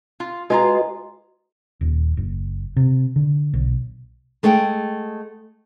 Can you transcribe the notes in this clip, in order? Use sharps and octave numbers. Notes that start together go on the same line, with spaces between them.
F4
G#3 F4 F#4 B4 D#5 A#5
D#1
F#1
C3
D3
B1
G#3 A3 G#4 F#5 G5